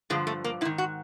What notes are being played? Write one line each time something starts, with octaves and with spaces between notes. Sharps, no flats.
G2 D3 F3 G#3
A3
A#3
G#2 D#3 E4
F#4